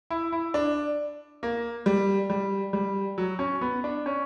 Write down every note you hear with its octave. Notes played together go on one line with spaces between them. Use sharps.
E4
E4
D4
A#3
G3
G3
G3
F#3
C#4
B3
D4
C#4